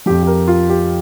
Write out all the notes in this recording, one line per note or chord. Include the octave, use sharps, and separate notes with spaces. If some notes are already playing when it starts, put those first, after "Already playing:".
F2 F3 G4
G4
A#4
F4
G4